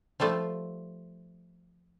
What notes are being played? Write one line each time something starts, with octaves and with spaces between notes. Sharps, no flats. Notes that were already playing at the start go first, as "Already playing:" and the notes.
F3 G3 A3 F4